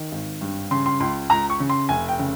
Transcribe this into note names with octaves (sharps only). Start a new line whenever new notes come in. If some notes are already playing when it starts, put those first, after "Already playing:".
Already playing: D#3
G#1
G2
C#3 C6
C6
C#2 C6
C#2 A#5
C#6
C#3
C6
F1 G#5
G5
C#3